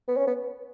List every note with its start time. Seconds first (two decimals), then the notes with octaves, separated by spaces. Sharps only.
0.08 B3
0.17 C#4
0.27 B3